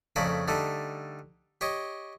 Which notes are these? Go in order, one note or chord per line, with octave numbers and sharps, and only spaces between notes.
F2 C#3 A3 D5 A#5 B5
D3 G3 A3 D#4
G4 C#5 D#5